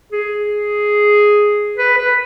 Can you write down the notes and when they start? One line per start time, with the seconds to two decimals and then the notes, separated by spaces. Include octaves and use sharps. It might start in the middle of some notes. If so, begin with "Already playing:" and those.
0.12 G#4
1.78 B4
1.98 B4